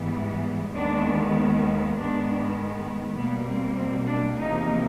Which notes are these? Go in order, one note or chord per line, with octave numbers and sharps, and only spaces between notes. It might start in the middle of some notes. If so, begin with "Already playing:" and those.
Already playing: G#2 E3 G3 B3
D#2 D#3 G#3 B3 D4
G#2 D#3 G#3 B3 D4
B2 G3 A#3 B3
C4
C4
D4
E2 C3 F3 A#3 D#4